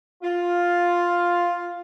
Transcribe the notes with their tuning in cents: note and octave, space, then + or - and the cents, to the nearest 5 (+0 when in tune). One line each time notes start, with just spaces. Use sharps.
F4 +5